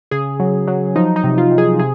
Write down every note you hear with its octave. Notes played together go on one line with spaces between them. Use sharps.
C#3 G#4
F#3
F#3
F3 D#4
D#4
C3
F4
C3
G#4
C3 G#4